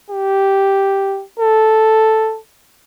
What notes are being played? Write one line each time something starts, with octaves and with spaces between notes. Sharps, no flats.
G4
A4